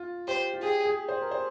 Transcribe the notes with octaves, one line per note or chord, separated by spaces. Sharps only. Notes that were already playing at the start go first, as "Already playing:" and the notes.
Already playing: F4
G4 C5
F4
G4 G#4
G#4
C5
A#4
C5